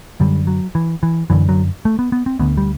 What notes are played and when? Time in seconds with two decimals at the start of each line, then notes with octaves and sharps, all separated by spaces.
0.20 F#2 D3 G3
0.47 F#3
0.75 E3
1.03 E3
1.30 F#2 D3 E3
1.49 F#3
1.85 A3
1.99 B3
2.12 B3
2.26 C4
2.39 D2 D3 B3
2.57 G3